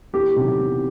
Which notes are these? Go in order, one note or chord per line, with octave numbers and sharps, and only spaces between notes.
E2 G4
C3 D#3 F#3
E2